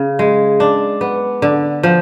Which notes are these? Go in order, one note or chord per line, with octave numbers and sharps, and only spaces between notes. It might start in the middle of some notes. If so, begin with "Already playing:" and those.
Already playing: C#3
G#3
D4
B3
D3
F3